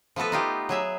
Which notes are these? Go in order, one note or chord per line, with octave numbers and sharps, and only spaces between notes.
F3 A3 B3 A4 B4
D#4 F4 G4
F#3 G#4 E5